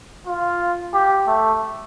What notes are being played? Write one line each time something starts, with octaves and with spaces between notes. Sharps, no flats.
F4
G4
A3